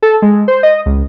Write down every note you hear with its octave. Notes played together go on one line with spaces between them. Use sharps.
A4
G#3
C5
D#5
C#2